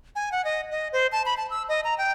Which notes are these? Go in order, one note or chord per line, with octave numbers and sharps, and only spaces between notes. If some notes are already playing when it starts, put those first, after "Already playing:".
G#5
F#5
D#5
D#5
C5
A5
B5
A5
E6
D#5
A#5
G5